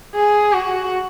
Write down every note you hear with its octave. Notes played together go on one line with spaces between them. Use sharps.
G#4
F#4